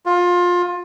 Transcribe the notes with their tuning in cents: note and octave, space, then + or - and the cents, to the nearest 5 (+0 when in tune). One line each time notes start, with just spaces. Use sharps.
F4 +20